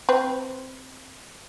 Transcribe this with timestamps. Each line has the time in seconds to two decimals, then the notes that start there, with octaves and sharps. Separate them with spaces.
0.09 C4 B4